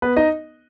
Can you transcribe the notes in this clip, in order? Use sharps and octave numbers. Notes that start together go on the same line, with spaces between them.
B3 B4
D#4 D#5